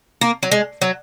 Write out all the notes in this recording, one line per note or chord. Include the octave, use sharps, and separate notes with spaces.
A#3
F#3
G#3
F#3